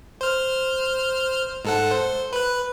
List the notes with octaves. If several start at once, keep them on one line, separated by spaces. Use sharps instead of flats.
C5 F6
G#2 A4 F#5
C5
B4 F#6